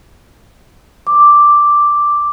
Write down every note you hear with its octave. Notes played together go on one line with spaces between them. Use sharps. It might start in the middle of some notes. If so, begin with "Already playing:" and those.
D6